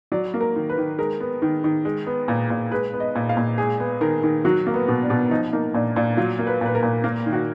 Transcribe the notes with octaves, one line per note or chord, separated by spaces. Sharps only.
F#3 D5
A#3
A#4
D#3
B4
D#3
G#3 A#4
B3
D#3
D#3
G#3
B3
A#2
A#2
G#3 B4
B3
D#5
A#2
F5
A#2
G#3 G#4
B3
D#3 A#4
D#3
F#3 F#4
A#3
B3
B2
D4
B2
F3 D#4
A#3 D#4
A#2 D4
A#2 D4
F#3 F4
A#3
B4
A#2 B4
A#4
A#2
A#3 A#4
D#3
F#4